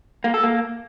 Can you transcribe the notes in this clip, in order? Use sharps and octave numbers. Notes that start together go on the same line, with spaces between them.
A#3
A4
A#3